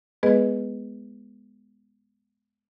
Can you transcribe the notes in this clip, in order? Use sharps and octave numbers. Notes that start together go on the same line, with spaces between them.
G#3 B3 G#4 B4 D#5